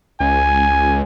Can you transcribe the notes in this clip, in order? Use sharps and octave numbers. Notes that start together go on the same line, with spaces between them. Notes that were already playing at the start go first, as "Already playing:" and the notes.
C#2 G#5